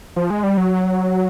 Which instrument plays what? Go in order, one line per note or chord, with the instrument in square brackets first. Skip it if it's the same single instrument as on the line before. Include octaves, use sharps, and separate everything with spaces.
[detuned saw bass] F3
G#3
G3
F#3